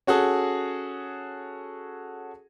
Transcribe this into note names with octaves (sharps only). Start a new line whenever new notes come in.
C#4 F#4 G#4 A4